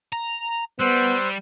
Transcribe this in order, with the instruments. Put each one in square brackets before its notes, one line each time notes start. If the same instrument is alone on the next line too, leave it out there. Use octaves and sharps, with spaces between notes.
[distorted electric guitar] A#5
[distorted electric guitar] G3 [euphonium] B3 [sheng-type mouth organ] C5 E6 F#6